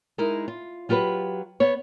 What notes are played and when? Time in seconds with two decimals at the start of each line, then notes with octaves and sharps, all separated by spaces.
0.18 G#3 D#4 E4 A#4
0.48 F4
0.89 F#3 F4 G4 A#4 B4
1.60 B3 C#5